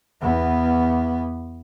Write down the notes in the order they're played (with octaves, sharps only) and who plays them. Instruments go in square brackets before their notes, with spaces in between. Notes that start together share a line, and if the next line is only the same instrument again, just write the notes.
[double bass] E2 B3